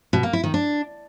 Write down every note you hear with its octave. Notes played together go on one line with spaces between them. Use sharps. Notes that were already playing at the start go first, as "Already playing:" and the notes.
B2
A#3
E4
D#3
D4